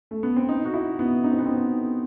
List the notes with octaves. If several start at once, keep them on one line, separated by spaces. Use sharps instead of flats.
A3
B3
C4
D#4
F#4
E4
B3
D#4
C4
B3
C4